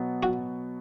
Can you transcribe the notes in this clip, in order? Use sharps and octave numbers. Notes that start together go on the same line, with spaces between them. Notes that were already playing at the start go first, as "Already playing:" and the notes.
Already playing: B2 F#3 B3
F#4